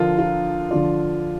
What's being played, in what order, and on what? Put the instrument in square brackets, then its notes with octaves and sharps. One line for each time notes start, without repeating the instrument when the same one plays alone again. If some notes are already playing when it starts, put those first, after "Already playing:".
Already playing: [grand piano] D3 F3 D4 A#4 [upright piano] F4
[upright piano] F4
[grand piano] D3 F3 D4 F4 D5